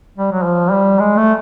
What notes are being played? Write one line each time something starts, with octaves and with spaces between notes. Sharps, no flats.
G3
F#3
F3
G3
G#3
A3